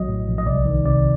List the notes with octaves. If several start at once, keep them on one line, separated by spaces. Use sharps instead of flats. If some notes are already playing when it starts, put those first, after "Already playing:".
Already playing: A#1 F#3 D#5
A2
A#1
D#5
C2 D5
D#3
C3 D5